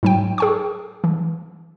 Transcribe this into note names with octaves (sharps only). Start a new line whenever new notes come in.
G#2 F#3 G5
G#4 G5 C#6
E3